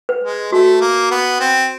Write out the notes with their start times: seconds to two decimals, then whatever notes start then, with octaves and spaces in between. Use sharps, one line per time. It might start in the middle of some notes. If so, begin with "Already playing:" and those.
0.09 B4
0.23 G#3
0.52 A3 F#4
0.81 A#3
1.11 B3
1.40 C4